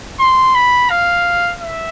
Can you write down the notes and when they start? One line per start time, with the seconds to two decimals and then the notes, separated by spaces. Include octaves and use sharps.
0.20 C6
0.55 B5
0.90 F5
1.61 E5